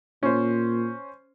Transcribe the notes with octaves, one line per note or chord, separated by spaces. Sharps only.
A#2 C#4 C5